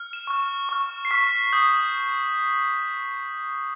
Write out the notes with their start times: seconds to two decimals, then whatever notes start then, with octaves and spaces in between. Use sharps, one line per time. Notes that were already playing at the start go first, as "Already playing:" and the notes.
Already playing: F6
0.13 E7
0.27 C#6 F6
0.69 C#6 F6
1.05 C7
1.11 C#6 F6 B6
1.53 D#6 G6